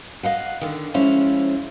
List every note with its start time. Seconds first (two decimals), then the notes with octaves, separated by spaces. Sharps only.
0.23 D#5 F5 F#5
0.61 D3 D#3
0.94 F3 G#3 C#4 E4 C5 F5